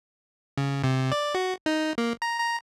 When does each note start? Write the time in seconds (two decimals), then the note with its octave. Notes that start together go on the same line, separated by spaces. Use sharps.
0.57 C#3
0.84 C3
1.12 D5
1.35 F#4
1.66 D#4
1.98 A#3
2.22 A#5
2.40 A#5